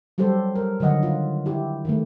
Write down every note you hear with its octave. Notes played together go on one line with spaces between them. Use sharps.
F#3 G3 G4 A4 C5
A#4
D3 D#3 F#3 D#5 F#5
F4
E4 G4
D#3 E3 A3